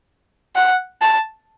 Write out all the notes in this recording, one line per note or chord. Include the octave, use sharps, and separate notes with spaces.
F#5
A5